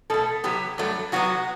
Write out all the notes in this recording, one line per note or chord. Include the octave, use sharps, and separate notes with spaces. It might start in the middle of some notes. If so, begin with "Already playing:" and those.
B2 A3 A4
C3 F#3 B3 G4
G2 F#3 A3
C3 F#3 B3 F#4